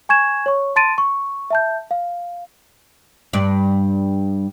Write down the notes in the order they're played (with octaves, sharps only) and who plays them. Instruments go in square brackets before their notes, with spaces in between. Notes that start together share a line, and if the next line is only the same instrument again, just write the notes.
[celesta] G#5 C#6 G#6 E7
C#5 C#6
A5 C6 A6 D7 D#7
C#6
E5 A5 G6
F5
[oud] G2 D5